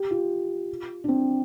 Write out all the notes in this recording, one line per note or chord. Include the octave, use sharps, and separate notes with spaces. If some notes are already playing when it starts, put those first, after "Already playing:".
Already playing: G4
F4
D4
C4